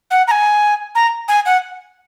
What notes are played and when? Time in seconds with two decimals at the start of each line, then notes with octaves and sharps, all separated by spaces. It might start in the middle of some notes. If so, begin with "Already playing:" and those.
0.11 F#5
0.27 A#5
0.31 G#5
0.95 A#5
1.28 G#5
1.46 F#5